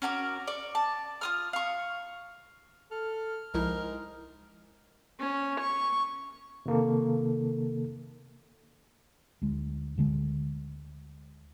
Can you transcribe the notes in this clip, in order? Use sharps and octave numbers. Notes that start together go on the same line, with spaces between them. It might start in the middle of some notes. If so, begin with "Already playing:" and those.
C#4 F#4 A#4 D6
D5 C#6
A5
F4 D#6 F6
F5 C#6
A4 F6
C2 G#2 F3 D#4 E4 A#4
C#4
C#6
C3 D#3 A#3 A4
D2 G#3
D2 D3 G#3